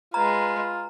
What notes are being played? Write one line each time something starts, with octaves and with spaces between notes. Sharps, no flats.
G#3 F4 B4 A#5